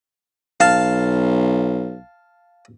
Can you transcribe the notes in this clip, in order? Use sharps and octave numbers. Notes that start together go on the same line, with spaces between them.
B1 F5 A5